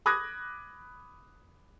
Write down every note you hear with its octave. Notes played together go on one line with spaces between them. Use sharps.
B5 D6 D#6 F#6 G#6 A#6